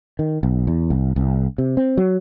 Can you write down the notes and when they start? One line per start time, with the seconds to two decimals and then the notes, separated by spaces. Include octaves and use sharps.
0.19 D#3
0.43 B1
0.67 E2
0.90 C2
1.16 C2
1.58 C3
1.77 C4
1.97 F#3